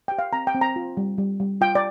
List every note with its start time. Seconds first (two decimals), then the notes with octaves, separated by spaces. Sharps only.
0.08 G4 G5
0.19 F5
0.33 C4 A#5
0.47 G5
0.55 C4
0.61 A#5
0.76 F4
0.97 G3
1.18 G3
1.40 G3
1.61 F4 G5
1.75 D5